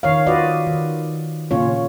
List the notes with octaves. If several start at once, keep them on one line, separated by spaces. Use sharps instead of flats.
D#3 C#5 F5
F4 F#4 B4 D5 D#5
D#3
A#2 C#3 C#4 F4 C#5